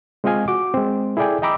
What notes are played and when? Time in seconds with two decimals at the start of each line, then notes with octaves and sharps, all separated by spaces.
0.24 G#3 C4 F4 D#5 F5 G#5
0.48 F#4 D6
0.74 G#3 C4
1.17 E4 G#4 A4 D5 G5 G#5
1.42 D#5 G5 A#5 B5 D6 E6